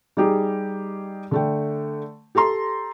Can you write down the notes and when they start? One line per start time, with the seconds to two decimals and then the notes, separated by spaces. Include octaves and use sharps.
0.17 G3 D#4 G4 G#4
1.31 D3 A3 G5
2.35 G4 A4 A#5 C6